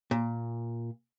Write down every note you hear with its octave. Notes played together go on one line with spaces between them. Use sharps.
A#2